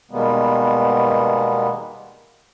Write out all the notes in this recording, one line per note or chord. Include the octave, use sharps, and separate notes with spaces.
B2 D#3 G3 G#3 A#3 B3